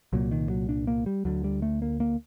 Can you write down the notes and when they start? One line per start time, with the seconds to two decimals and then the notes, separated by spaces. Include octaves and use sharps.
0.13 C2 A#2 F#3
0.31 D#3
0.50 F#3
0.69 D4
0.87 A#3
1.06 G3
1.25 D2 D3 F#3
1.44 G3
1.62 A3
1.82 A#3
2.00 A#3